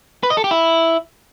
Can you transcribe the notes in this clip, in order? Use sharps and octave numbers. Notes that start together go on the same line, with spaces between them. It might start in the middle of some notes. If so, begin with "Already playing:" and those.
B4
D#5
A4
G4
E4